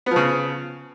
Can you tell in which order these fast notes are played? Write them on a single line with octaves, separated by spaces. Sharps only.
B3 F3 C#3